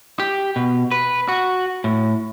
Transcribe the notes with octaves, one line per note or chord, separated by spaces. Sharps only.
G4
B2
B4
F#4
A2